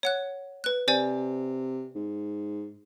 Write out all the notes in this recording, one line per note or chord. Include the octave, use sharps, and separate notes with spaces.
C#5 F#5 F#6
B4 F#6
C3 C5 D5 G#5
G#2